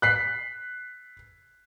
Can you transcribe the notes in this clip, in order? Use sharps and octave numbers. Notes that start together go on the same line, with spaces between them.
F#6 B6 C7